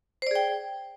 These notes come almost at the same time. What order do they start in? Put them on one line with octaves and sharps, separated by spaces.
C5 D5 G#4 G5